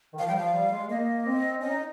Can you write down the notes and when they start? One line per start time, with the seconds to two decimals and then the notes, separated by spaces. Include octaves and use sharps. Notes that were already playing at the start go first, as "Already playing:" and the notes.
0.14 D#3
0.19 F3 F5
0.28 G3 G5
0.36 F3 F5
0.54 G3
0.72 G#3
0.89 A#3 D#5
1.26 C4
1.61 C#4 D#5
1.69 D#4